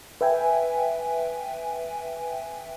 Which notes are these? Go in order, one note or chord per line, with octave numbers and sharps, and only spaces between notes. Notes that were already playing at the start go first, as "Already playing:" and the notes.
B4 E5 G5 G#5